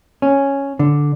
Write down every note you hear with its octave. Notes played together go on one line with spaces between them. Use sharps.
C#4
D3